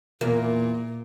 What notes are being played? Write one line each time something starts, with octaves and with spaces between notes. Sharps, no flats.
E2 A#2 A#3